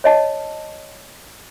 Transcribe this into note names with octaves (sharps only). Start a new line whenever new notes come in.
C#5 D#5 A5